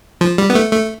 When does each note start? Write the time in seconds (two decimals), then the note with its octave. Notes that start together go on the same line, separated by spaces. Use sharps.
0.21 F3
0.38 G3
0.50 B3
0.55 A3
0.72 A3